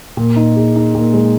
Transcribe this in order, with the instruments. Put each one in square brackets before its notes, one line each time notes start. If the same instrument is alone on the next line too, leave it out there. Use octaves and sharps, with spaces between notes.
[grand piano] A#2
D#4
G#4
D#4
A#2
G#3